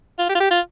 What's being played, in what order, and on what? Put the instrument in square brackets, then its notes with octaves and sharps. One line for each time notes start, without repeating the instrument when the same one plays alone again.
[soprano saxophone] F4
G4
F4
G4
F4